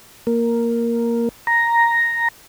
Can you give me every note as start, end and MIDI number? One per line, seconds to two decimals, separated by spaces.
0.27 1.29 58
1.47 2.28 82